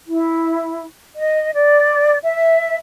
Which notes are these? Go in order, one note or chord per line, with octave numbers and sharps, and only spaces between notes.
E4
D#5
D5
E5